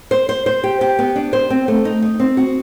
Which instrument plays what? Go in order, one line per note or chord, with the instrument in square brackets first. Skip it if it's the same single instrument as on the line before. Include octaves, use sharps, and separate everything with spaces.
[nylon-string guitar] C5
C5
C5
G4
G4
B3
D4
C5
C4
A3
D#4
D#4
C4
F#4